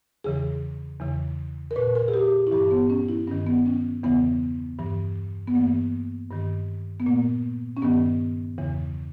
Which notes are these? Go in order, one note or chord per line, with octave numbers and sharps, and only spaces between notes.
E2 C#3 E3 G#4
E2 C#3 E3
A#4
A#2 B4
A#4
G#4
G4
E4
G2 E3 G4
B3
C#4
E4
G2 D#3 C#4
B3
C#4
E2 C#3 E3 B3
G2 E3
B3
G2 E3 A#3
G2 D#3
B3
A#2 A#3
C#4
G2 D#3 B3
E2 C#3 E3